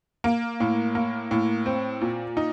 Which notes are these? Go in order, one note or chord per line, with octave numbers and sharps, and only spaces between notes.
A#3
A2
A#3
A2
C4
A#2
D#4